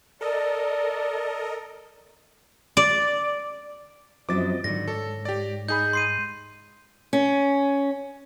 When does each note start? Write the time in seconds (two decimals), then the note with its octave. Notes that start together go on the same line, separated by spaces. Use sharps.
0.21 A4 A#4 D5 D#5
2.77 D5
4.29 F#2 F3 F#3 C4 E4 D#5 D6 A6
4.64 G#2 D3 D#3 F#3 A#6
4.88 A4 C#5
5.25 G4 D5
5.68 D#4 G#4 B5 G6
5.93 C6 C7 D#7
7.13 C#4